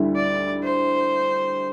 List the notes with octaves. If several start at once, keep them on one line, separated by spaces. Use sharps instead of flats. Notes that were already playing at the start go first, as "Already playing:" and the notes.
Already playing: D2 D3 G3 E4
D5
C5